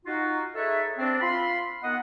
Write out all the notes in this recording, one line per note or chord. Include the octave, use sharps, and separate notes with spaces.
D#4 F4 F#4
D#4 G#4 A4 B4 C#5 E5
C4 D4
F4 B5 C6
D#3 B3 D#5 F#5